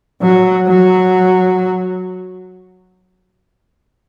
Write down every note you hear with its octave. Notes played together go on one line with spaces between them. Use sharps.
F#3
F#3